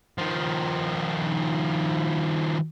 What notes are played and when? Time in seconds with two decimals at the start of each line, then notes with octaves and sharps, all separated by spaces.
0.18 D#3 F3